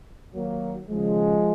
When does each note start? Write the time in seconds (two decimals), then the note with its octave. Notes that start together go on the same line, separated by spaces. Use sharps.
0.34 D#2 D#3 F#3 A#3
0.89 D#2 C#3 F3 G#3